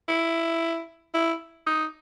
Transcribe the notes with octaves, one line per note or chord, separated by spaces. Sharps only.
E4
E4
D#4